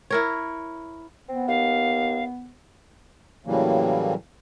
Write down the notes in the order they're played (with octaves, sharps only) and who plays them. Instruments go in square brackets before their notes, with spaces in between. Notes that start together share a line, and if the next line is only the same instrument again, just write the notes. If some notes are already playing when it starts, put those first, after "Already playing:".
[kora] E4 A#4 C#5
[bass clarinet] B3 [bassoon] C4
[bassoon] D#2 [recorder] F5
[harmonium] A2 C#3 E3 F#3 G3 A#3